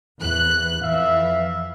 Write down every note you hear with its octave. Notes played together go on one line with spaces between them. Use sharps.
E2 E3 F#6
F2 E3 E5 F5